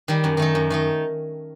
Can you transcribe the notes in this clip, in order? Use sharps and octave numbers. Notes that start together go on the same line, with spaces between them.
D#3 G3
F#2
D#3 A3 D#4
F#2
D#3 A3 D#4